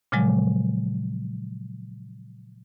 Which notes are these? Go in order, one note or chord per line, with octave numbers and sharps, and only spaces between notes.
A#2 C#3 F3 F#3 G#3